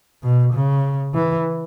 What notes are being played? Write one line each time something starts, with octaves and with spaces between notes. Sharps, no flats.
B2
C#3
E3